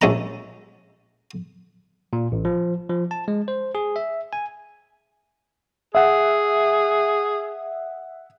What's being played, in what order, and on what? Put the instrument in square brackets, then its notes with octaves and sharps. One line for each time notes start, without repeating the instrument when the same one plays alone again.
[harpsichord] A#1 G#3 C#4 E5 A5 A#5
[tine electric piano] A#2
A1
F3
F3
A5
G#3
C5
G#4
E5
G#5
[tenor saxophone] G#4 [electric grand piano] E5 F#5